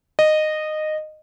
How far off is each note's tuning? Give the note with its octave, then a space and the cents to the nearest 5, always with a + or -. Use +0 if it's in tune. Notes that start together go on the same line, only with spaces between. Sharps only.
D#5 -15